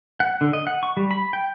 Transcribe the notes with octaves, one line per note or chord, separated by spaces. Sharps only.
F#5
D3
D#5
F#5
C#6
G3
B5
G5